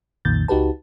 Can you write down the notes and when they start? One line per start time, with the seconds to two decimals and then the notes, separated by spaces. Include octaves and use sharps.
0.25 B1 F2 A#2 D#3 G6 A6
0.48 C#2 D#4 F#4 G4 B4 A5